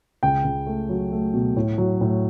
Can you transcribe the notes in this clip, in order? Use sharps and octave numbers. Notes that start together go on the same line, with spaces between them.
C#2 G5
C#2
A3
F#3
A3
B2
A2
F#3
A2